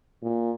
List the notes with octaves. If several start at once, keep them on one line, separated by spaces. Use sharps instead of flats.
A#2